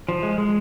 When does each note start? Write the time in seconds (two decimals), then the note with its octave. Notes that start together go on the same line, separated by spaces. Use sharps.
0.09 F3
0.23 G#3
0.38 G#3